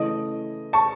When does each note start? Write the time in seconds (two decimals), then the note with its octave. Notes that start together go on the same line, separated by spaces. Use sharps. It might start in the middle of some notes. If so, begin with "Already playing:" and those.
Already playing: C#3 E3 A3 E4 D#5
0.73 A5 C#6